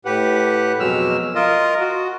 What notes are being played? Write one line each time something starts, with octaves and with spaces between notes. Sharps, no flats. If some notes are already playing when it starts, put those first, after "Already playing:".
A2 G4 B4 F#5
F2 B2 F#3 G#3 E6 F6
F4 A#4 D#5
F#4